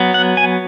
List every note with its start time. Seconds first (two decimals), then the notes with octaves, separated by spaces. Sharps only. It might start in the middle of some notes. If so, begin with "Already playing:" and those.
Already playing: F#3 B3
0.14 F#5
0.37 G#5